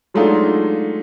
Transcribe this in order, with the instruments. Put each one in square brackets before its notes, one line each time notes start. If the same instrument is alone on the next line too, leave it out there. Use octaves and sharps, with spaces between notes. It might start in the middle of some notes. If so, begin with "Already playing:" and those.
[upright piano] F#3 G#3 A3 D4 D#4 F4